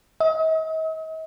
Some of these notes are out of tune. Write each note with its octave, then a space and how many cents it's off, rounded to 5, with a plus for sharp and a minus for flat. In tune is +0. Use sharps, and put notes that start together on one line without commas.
D#5 +45